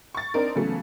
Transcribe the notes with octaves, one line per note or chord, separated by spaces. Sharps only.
C#6 A6
C4 D4 D#4 A#4
C#3 E3 F#3 A3 B3